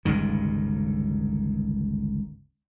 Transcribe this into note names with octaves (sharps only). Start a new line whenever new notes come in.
G1 C#2 G2 D#3